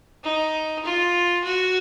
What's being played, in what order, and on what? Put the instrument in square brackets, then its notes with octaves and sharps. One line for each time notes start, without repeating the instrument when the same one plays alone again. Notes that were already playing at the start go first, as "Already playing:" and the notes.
[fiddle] D#4
F4
F#4